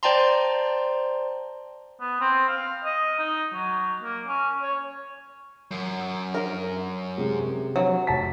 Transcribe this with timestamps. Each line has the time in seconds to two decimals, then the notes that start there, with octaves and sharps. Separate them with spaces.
0.03 C5 D5 G5 A5 A#5 C6
2.00 B3
2.21 C4
2.48 F5
2.84 D#5
3.19 D#4
3.53 F#3
4.03 A#3
4.27 C#4
4.62 C#5
5.71 F#2
6.35 A#4
7.18 C3 G#3
7.76 F#3
8.07 F1 A5 B6